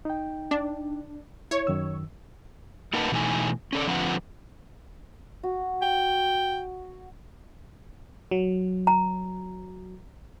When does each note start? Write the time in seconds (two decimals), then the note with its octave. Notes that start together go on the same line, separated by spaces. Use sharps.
0.05 D#4 G5
0.51 D4
1.51 E4 C#5
1.67 F#2 D#3 E6
2.93 A#3 D#4 A#4 B4 F#5 A5
3.12 B2 E3 A3 D#4 G#5
3.73 C#4 A4 D5
3.87 D3 F3 C4 F4 B4 F#5
5.43 F#4
5.82 G5
8.31 F#3
8.87 A#5